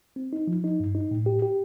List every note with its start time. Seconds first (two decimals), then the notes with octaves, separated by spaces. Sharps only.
0.16 C4
0.33 D#4
0.48 F3
0.64 D#4
0.80 G2
0.95 D#4
1.11 A2
1.26 G4
1.42 G4